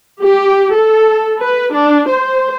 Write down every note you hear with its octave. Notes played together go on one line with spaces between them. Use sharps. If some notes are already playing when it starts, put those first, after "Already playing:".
G4
A4
B4
D4
C5